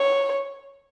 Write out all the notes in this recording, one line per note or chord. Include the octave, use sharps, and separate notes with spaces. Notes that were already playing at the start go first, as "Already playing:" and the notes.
Already playing: C#5